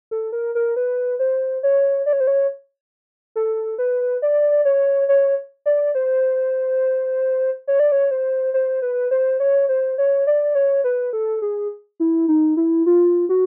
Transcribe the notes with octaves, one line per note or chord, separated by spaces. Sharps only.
A4
A#4
A#4
B4
C5
C#5
D5
C#5
C5
C#5
A4
B4
D5
C#5
C#5
D5
C5
C#5
D5
C#5
C5
C5
B4
C5
C#5
C5
C#5
D5
C#5
B4
A4
G#4
E4
D#4
E4
F4
F#4